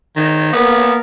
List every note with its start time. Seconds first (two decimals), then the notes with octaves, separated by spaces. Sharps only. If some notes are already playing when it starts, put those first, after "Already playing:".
0.16 D#3
0.53 A#3 B3 A#4